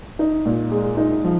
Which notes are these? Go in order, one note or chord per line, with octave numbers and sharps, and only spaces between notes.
D#4
A#2
G#3
D#4
F3